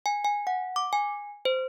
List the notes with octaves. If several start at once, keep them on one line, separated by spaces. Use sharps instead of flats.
G#5
G#5
F#5
D6
G#5
C5